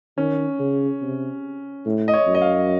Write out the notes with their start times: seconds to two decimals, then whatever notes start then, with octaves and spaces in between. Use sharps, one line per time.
0.18 D#3 C#4
0.60 C#3
1.02 C3
1.86 A2
2.08 D#5
2.13 C#5
2.27 F#2
2.35 D#5
2.42 F5